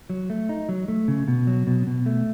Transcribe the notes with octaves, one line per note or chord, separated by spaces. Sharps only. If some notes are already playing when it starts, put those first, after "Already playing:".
F#3
A3
D#4
F#3
A3
C#3
B2
F#3
B2
B2
A3